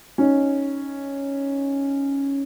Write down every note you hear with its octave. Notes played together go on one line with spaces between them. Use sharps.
C#4 D#4